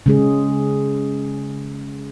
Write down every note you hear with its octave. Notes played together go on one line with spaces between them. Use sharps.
C#3 G#3 G#4